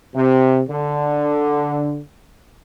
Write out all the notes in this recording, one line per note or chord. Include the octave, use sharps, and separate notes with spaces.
C3
D3